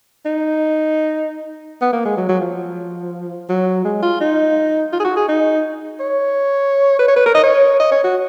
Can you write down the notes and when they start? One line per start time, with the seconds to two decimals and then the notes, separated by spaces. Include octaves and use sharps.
0.26 D#4
1.81 B3
1.93 A#3
2.05 G#3
2.17 F#3
2.29 F#3
2.41 F3
3.49 F#3
3.84 G#3
4.02 F4
4.20 D#4
4.92 F4
5.00 G#4
5.04 F#4
5.16 G#4
5.28 D#4
6.00 C#5
6.99 B4
7.08 C#5
7.16 B4
7.26 A#4
7.34 D#5
7.43 C#5
7.80 D#5
7.91 C#5
8.04 F#4